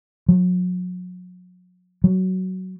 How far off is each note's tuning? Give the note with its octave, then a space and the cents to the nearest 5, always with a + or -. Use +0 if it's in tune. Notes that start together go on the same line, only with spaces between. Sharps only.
F#3 -35
F#3 +10